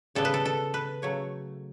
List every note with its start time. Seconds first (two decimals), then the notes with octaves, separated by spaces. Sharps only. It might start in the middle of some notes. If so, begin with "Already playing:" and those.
0.15 C#3 G3 B3 A4
0.25 B4
0.34 A4
0.45 A4
0.74 B4
1.02 C#3 F#3 A3 C#5